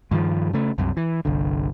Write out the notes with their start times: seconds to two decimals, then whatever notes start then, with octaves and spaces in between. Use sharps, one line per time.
0.11 G2 D#3 F3
0.53 C#3 A3
0.78 C2 F#2 C3
0.97 E3
1.25 G1 C2 D3